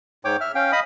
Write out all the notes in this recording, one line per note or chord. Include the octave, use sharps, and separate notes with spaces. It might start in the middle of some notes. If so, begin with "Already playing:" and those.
G#2 C#5 G5 D6
E5 F6
C#4 F5 G5
D#5 F5 B5 D#6